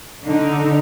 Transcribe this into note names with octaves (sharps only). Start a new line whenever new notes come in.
D3 D#4